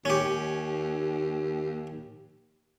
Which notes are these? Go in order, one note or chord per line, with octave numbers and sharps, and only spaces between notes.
D#2 C#4 G4